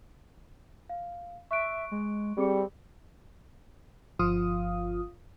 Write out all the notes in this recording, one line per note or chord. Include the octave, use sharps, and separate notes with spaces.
F5
E5 C#6 F#6 D7
G#3
G3 C4 G#4 D6 C#7
G1 F3 F4 F5 D#6